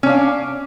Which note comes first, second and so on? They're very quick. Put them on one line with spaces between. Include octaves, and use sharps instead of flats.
C#4 D4 F5